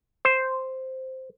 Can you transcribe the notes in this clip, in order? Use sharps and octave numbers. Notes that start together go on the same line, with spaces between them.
C5